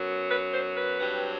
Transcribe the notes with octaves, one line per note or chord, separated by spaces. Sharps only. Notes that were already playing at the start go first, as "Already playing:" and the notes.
Already playing: F#2 F#3 B3
B4
C5
B4
G2 F#3 C4